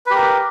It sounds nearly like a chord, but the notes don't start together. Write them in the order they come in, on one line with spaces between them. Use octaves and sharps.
B4 G4 A#4